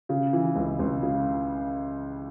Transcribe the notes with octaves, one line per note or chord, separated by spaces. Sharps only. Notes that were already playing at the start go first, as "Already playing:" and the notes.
C#3
E3
C#2
C#2
C#3